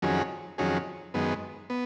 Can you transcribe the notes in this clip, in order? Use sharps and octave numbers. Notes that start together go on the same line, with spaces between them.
F2 D#3 F#3 C#4 G#4
F2 D#3 F#3 C#4 G#4
F#2 D#3 G#3 B3
B3